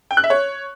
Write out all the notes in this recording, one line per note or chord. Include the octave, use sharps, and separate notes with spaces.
G5
F#6
E5
C#5